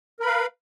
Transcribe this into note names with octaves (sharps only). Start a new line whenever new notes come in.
A#4 B4 F5 B5